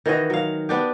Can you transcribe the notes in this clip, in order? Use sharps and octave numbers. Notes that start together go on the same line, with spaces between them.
D#3 E3 F#4 D#5
F#3 F5
B3 D4 G4